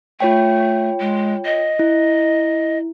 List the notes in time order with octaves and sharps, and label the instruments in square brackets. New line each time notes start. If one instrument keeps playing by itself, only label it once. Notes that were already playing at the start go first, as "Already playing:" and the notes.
[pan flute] A3 [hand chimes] F4 C#5 G5
[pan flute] G#3
D#5
[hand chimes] E4